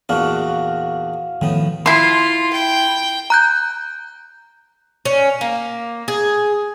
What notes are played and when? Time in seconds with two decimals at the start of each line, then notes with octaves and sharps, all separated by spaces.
0.09 E2 A#2 D4 F#4 F5
1.41 A2 D#3 F3 B3
1.86 E4 F4 C6
2.52 G5
3.30 A#5 F#6 G6
5.05 C#4
5.41 A#3
6.08 G#4